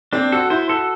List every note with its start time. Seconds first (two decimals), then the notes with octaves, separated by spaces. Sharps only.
0.13 C4 D4
0.32 F#4 A4
0.50 E4 C5
0.69 F#4 A4